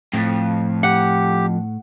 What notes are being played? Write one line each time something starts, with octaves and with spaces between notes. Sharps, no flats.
F2 A2
G4 F#5